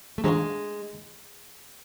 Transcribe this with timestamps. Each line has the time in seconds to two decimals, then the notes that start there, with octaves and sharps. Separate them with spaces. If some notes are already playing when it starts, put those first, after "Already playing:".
0.18 A3
0.24 D3 F#3 G#3 C#4 F4